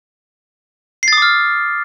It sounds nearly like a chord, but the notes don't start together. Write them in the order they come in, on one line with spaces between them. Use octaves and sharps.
C7 A6 D#6 D6 F6